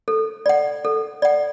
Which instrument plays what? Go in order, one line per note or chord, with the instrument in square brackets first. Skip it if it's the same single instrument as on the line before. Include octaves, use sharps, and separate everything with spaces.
[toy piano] A4
D5 F#5
A4
D5 F#5